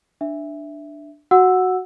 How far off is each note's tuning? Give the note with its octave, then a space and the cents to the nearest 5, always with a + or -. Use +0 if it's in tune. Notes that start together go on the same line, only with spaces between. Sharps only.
D4 +10 E5 +0
F#4 +0 F#5 -10 E6 +0